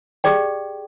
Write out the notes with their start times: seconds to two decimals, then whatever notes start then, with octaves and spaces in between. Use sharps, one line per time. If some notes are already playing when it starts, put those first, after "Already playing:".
0.24 G4 G#4 D5 G5